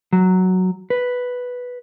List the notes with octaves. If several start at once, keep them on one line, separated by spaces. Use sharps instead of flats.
F#3
B4